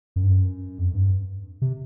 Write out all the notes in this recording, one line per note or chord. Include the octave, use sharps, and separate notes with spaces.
F#2
G2
F#2
F2
G2
C3